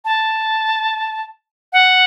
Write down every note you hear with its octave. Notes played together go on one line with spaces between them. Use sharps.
A5
F#5